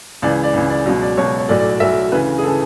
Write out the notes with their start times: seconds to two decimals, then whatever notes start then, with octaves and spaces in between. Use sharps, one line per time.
0.22 C#2 C#3 E3 D5
0.43 D5
0.54 C#2 C#3 E3
0.70 D5
0.86 C#2 B2 F#3
1.02 D5
1.17 C#2 B2 F#3 C#5
1.39 C#5
1.49 B1 A2 F#3 D5
1.59 D5
1.70 D5
1.80 B1 A2 F#3 E5
2.12 D2 C#3 E3 B4
2.38 G#4
2.43 A4
2.46 C#3 E3